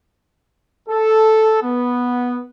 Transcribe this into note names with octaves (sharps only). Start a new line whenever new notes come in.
A4
B3